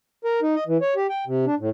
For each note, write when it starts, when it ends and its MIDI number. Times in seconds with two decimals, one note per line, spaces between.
0.25 0.40 70
0.42 0.55 63
0.56 0.64 75
0.67 0.77 52
0.82 0.94 73
0.96 1.07 67
1.09 1.25 79
1.27 1.45 48
1.46 1.55 62
1.59 1.70 45